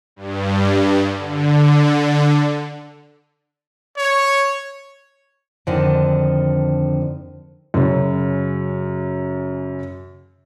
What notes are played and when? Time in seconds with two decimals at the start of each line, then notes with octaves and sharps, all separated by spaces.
0.16 G2
1.17 D3
3.98 C#5
5.67 F2 D3 D#3
7.74 F#2 C#3